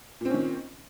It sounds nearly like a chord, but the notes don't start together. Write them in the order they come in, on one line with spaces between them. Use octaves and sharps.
A#2 C4 C#4 D#3